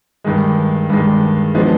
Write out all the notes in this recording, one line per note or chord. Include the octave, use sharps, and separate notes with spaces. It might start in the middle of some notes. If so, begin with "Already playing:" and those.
G2 D#3 G#3
G2 D#3 G#3
F3 G#3 B3 D4